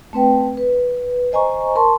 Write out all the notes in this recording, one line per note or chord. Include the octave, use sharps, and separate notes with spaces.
A3 C4 B4 G5
B4
C5 D#5 G#5 A#5 C#6
A#4 A5 C6 C#6